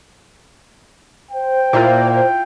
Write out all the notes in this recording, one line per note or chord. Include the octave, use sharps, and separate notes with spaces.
C5 G5
A#2 A#3 E4 F4
G5